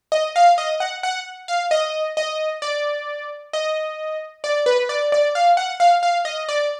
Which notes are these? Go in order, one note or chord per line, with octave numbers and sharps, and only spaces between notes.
D#5
F5
D#5
F#5
F#5
F5
D#5
D#5
D5
D#5
D5
B4
D5
D5
F5
F#5
F5
F5
D#5
D5